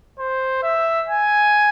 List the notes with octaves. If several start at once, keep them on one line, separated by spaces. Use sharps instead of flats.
C5
E5
G#5